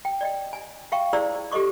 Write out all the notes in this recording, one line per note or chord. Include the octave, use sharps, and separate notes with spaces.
G5
D5 D#5 G5
G#5
E5 F5 G5 C#6
E4 G#4 C5 D5 E6
G4 A4 C5 D#5 C#6 D6